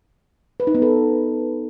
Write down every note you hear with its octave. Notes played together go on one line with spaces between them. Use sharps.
B4
D#4
B3
A4